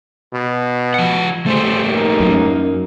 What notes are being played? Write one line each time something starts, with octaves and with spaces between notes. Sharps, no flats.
B2
F3 F#5
A1 G3 A3 G#4 C5
A#3 D#4
F#2